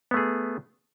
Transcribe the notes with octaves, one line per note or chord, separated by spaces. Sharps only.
A3 B3 G#4